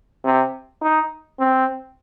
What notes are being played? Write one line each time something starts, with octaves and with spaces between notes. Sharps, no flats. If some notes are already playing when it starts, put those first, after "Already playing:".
C3
D#4
C4